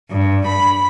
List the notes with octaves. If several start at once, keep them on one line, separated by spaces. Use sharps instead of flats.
G2
B5